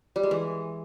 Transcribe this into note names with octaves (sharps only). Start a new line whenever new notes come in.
G3
G#3
E3